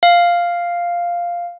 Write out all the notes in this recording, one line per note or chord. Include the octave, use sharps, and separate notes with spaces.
F5